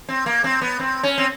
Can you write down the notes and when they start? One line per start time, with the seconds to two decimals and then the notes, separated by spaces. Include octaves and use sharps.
0.08 C4
0.26 A#3
0.44 C4
0.62 B3
0.79 C4
1.03 C#4
1.18 C4